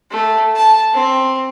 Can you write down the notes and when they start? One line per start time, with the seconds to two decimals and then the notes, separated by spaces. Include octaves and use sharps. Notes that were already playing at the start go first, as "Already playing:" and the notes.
0.11 A3
0.56 A5
0.93 C4